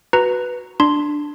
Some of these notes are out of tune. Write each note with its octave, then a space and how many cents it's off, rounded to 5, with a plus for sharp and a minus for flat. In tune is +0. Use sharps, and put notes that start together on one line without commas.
F#4 +0 B4 +0 A#5 +0
D4 +10 C6 +0